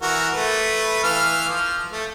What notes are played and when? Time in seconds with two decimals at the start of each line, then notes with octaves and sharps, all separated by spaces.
0.02 E3 F#4 A#4
0.34 A3 B4
1.04 E3 F5 F6
1.50 F3
1.92 A3